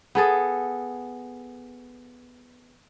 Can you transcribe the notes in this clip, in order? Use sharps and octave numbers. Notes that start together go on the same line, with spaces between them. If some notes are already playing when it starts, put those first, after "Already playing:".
B3 G#4 A4